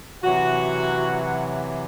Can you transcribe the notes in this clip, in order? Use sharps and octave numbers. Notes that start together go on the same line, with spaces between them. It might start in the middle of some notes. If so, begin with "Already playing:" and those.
C3 E3 F#3 F#4 F#5